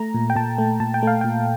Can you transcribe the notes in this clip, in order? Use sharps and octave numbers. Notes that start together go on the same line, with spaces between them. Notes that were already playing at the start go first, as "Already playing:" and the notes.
Already playing: A3 A#5
A#2
G5
A#2 A5
A3
A#2 A5
G5
A3 F5
A#2 G5